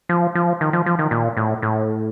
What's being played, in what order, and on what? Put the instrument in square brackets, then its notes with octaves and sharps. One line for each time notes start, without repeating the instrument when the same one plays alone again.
[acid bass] F3
F3
D#3
F3
F3
D#3
A#2
A2
A2